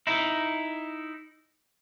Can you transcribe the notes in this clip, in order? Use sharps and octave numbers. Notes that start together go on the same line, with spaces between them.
D#4 E4